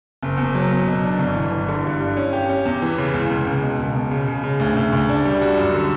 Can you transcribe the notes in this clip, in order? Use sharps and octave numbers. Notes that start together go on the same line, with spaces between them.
F#1
E2
F#3
E2
B2
D4
G1
E3
E3
D3
G2
G2
C#4
G4
C#4
E2
E3
C#3
C#2
C#2
C#2
B2
E1
B2
C#3
C#3
C#3
D2
D2
D2
D4
G3
F#4
F#2
D3